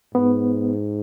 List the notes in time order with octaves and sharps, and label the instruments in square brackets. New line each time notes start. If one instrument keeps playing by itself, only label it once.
[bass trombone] G#2 [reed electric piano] B3